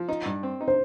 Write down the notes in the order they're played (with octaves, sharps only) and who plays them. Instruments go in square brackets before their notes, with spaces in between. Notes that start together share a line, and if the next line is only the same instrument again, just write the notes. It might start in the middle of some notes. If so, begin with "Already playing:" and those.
Already playing: [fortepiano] F3
D#4
G2
C4
D#4
[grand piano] C5